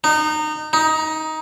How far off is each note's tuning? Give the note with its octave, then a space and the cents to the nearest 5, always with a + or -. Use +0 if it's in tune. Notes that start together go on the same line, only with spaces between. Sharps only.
D#4 -25
D#4 +15